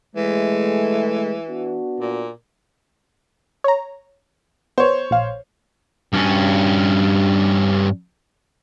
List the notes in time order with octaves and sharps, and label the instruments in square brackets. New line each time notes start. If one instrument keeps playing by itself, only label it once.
[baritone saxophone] E3 [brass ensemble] G#3 A3
[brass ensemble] B3 D4 F#4
[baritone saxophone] A#2
[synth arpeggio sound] C#5 A#5
[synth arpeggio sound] B3 [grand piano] C5 C#5
[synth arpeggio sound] A#1 F5
[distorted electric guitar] G2 C#4